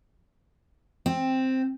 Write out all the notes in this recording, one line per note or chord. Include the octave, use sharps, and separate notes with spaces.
C4